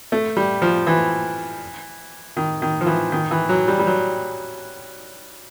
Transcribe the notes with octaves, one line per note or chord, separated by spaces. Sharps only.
A3
G3
F3
E3
D#3
D#3
F3
E3
D#3
E3
F#3
G3
G3
F#3